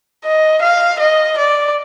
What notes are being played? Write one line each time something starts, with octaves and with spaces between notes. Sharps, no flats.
D#5
F5
D#5
D5